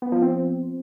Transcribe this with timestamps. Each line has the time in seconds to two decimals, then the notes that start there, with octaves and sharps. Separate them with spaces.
0.02 B3
0.12 F3
0.22 C4